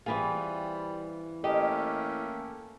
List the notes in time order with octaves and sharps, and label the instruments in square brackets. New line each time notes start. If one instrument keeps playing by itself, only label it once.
[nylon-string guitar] E3 C4 G#4 [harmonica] G3 [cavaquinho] F4 B4
[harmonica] A3 A#3 C#4 [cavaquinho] G4 [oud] D#5